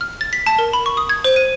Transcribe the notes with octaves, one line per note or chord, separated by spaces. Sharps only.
F6
A6
B6
A5
A#4
B5
C#6
D#6
G#6
C5
D#7